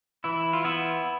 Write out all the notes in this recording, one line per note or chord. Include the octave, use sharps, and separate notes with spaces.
E3 E4
F4
B3 E4